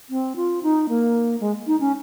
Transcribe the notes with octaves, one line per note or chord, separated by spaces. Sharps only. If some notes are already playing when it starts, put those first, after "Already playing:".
C4
F4
D#4
A#3
G#3
D#4
C#4